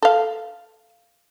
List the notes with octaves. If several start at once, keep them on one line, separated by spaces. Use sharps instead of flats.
A4 F5